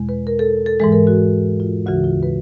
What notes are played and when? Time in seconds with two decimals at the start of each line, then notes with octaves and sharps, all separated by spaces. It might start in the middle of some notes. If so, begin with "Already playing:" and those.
Already playing: E2 B2 G#3
0.09 B4
0.27 A#4
0.39 A4
0.66 A4
0.80 G#2 E3 G#3 A4
0.92 A#4
1.07 F#4
1.60 F4
1.86 D2 C#3 E3 F#4
2.04 F4
2.23 B4